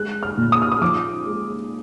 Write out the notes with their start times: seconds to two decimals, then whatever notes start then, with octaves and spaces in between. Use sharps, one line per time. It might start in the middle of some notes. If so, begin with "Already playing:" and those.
Already playing: G#3 F#6
0.23 F6
0.37 A#2
0.52 D#6
0.62 F6
0.72 D#6
0.81 F3 D6
1.26 G#3